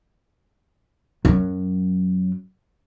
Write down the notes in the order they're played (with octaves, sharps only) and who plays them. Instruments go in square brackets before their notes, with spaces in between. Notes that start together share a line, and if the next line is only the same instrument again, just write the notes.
[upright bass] F#2 F#3